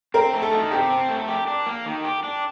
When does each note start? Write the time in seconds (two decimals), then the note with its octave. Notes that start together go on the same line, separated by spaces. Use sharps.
0.14 C4 A#4
0.33 A3
0.42 A4
0.51 D#3
0.71 C3 G4
0.90 C4
1.09 A3
1.28 G4
1.47 D4
1.66 A#3
1.86 D#3
2.04 G4
2.24 D4